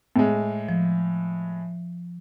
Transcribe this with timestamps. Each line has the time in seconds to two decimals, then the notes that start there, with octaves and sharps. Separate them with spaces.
0.16 A2 G#3
0.69 F3